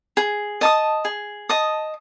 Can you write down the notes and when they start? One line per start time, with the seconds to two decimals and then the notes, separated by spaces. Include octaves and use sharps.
0.17 G#4
0.61 D#5 A5 D#6
1.05 G#4
1.49 D#5 A5 D#6